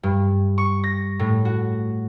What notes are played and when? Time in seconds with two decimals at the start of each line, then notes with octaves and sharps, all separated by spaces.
0.03 G2
0.58 C#6
0.84 A#6
1.19 A2
1.45 F#4